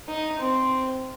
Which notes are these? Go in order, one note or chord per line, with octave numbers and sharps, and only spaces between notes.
D#4
C4